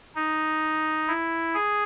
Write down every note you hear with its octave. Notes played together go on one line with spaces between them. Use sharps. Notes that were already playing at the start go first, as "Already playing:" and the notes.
D#4
E4
G#4